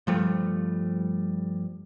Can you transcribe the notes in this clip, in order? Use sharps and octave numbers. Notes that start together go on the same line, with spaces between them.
G2 F3 G3 A3